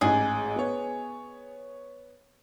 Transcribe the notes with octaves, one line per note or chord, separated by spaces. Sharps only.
A1 G#2 G#4
B3 C#5